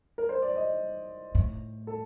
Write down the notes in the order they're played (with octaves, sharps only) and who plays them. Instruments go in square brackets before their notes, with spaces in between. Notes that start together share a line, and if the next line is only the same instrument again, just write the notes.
[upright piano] A#4
C5
D5
D#5
[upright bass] A2
[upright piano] A4